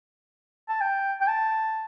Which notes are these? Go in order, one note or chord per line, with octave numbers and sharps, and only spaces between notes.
A5
G5
G5
A5